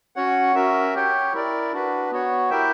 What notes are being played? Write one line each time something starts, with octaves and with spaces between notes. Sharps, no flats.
C#4 F#4 C#5 F#5
C#4 F#4 A#4 E5
G4 C#5 G5
E4 A#4 D5
D4 F#4 B4
B3 F#4 C#5
E4 G4 A#4 E5 G5